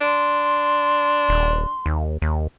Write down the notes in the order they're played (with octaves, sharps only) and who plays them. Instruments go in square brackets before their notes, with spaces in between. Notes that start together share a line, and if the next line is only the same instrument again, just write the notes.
[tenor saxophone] D4 [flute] C6
[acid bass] D#1
D#2
D#2